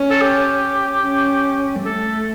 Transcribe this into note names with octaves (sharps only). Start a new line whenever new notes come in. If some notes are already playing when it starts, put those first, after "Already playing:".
Already playing: C#4
A4
G4
C#4
A3 A4